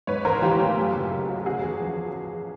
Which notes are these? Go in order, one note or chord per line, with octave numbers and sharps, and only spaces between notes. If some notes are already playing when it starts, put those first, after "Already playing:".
G#2 B4 C#5
A1 A#4 C5
E3 F4 G4
A3
F#2
F#1
C#3
F#3
C#3 F#4 G#4
E2
F3